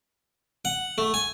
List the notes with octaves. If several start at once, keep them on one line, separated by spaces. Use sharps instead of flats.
F#5
A3
G#5